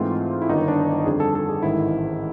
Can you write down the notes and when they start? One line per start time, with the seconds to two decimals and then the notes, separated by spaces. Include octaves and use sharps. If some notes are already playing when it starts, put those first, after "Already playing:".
Already playing: G#2 E3 A3 C4 F4
0.42 E4
0.49 G1 G2 D#3 D#4
0.68 D4
1.06 F2 D3 G3 G#4
1.20 A4
1.35 A4
1.49 G#4
1.62 A1 G#2 D#3 E4